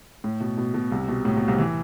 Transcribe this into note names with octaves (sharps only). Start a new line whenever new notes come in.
A2
B2
B2
B2
C2 C3
B2
A2
B2
C2 C3
E3